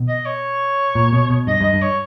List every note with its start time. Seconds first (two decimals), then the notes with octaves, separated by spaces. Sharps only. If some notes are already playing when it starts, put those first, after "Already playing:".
Already playing: B2
0.09 D#5
0.26 C#5
0.95 A#2
1.13 B2
1.30 B2
1.47 G2 D#5
1.61 G2
1.64 D#5
1.73 G2
1.82 C#5